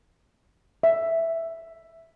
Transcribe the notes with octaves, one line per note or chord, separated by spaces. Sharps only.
E5